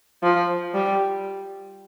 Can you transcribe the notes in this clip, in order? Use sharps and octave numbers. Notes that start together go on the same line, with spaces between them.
F3
G3